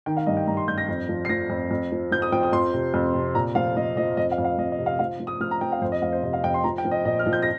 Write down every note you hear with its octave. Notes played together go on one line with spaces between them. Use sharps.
D#3 G5
F5
G2 D#5
G5
G2 A#5
C6
G2 G6
A#6
F2
F3
C7
F3 A#6
F2
F2
F3
F3 G6
D#6
F3 G5
D#6
F2 C6
C3
F2
C3
A#2 A#5
F3 F5
F3 D#5
F3 D#5
F2 D#5
F5
F2
F5
F2 D#5
D#5
C3
F5
F3 F5
F3
D#6
F3 F6
A#5
F3 G5
F5
F2 C5
D#5
F2 F5
C5
C3 D#5
F5
F2 G5
C6
F3 A#5
G5
F3
D#5
A#2 D#5
F6
F3
G6
A#6